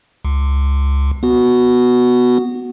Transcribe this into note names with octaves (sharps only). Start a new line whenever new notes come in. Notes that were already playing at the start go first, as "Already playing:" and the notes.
C#2
B3 F#4